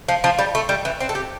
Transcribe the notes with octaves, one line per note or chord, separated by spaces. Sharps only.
F3
F3
G3
A3
G3
E3
C4
A4
G4